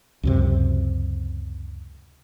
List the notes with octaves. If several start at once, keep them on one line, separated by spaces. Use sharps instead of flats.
C#2 F#2 C3